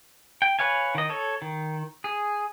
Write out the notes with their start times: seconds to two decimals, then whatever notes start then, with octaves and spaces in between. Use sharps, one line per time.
0.42 G5
0.59 B4 C#5 F5 G#5
0.95 D#3 D#5
1.09 A4 C#5
1.42 D#3
2.04 G#4